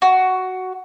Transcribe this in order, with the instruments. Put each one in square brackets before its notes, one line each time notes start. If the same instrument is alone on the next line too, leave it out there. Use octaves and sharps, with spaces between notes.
[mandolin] F#4